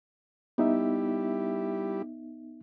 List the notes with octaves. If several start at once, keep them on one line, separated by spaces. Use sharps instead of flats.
G3 B3 D#4 E4 G4 E5